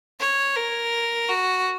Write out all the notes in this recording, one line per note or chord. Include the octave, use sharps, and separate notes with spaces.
C#5
A#4
F#4